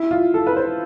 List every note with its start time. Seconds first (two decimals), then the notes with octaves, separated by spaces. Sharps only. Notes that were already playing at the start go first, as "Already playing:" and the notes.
Already playing: E4
0.11 F4
0.34 A4
0.47 B4
0.57 C5